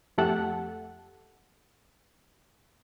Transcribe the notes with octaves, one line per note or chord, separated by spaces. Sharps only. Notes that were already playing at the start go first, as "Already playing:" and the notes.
F2 A3 G4 A4 F#5